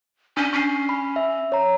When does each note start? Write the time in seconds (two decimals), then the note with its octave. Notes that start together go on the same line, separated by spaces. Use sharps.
0.37 C#4 D4
0.53 C#4 C#6 C7
0.89 B5
1.16 E5
1.52 C#5 A#5